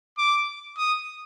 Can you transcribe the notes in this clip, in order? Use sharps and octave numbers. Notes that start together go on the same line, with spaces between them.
D6
D#6